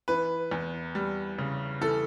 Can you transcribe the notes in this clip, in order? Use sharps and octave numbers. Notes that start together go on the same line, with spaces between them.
E3 B4
E2
G3
C#3
E3 A4